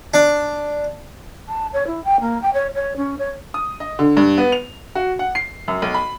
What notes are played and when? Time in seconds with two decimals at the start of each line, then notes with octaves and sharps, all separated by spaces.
0.14 D4
1.48 A5
1.73 C#5
1.87 E4
2.04 G5
2.20 A#3
2.42 G5
2.54 C#5
2.75 C#5
2.97 C#4
3.18 C#5
3.54 D#6
3.80 D#5
3.99 D3
4.17 G2
4.38 B3
4.52 F7
4.95 F#4
5.19 F#5
5.35 C7
5.68 F#2
5.82 B1
5.94 B5